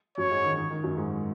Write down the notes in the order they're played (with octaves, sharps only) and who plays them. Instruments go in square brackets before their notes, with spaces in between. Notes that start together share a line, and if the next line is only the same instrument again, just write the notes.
[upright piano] F#2 F#3 [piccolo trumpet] C#5
[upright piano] G#2 G#3
D#3
D#3
D#3
F#2 F#3
G#2 G#3